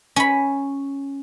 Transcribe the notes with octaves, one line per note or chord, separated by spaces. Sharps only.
C#4 B5